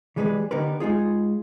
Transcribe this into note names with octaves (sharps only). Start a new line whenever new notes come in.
E3 G3 G#3 G#4 A4 B4
D3 B3 D#4 G4 A#4 B4
G#3 D#4 F4 G#4